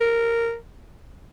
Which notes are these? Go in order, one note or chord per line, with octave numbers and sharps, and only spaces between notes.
A#4